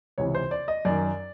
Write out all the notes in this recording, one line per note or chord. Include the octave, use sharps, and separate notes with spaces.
C#2 C3 E3 C#5
C5
D5
D#5
F#2 D#3 D5